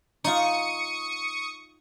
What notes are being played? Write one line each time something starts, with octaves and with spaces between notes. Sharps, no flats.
D#4 F4 C#6 D#6 C#7